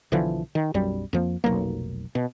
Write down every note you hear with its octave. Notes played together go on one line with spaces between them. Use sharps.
B1 D3 E3 F3
D#3
B1 F#2 G3
F2 F3 A#3
F1 B1 F#3 A#3
B2